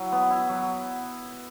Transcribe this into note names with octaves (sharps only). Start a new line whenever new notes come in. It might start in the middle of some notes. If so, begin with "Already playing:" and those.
Already playing: F#3 E4
B3
E4
F#3